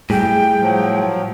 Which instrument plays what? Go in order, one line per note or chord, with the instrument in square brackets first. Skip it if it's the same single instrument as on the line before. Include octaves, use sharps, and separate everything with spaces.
[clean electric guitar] A2 [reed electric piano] G3 G#4 [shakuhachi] G5
[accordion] F3 F#3